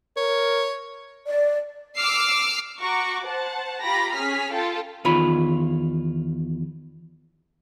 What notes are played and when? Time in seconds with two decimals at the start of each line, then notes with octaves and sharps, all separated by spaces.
0.17 A#4 C#5
1.26 D5
1.97 D6 E6 F6 C7
2.80 F#4 A#5 C#6 D6
3.27 C5 F#5 A5
3.83 F4 G4 A#5 B5 A#6
4.13 C#4 G#4 F6 B6
4.52 F4 A4 F5 G5 A5
5.05 E2 D#3 F4 C#5 B5